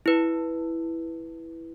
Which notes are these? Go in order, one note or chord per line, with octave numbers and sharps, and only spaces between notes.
E4 B4